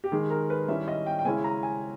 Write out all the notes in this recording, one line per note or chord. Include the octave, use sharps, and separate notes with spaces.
G4
D#3 G#3 D#4 G#4
A#4
B4
D#3 G3 C#4 E4 E5
D#5
G5
G5
C#3 G#3 C#4 E4 G#5
A#5
G#5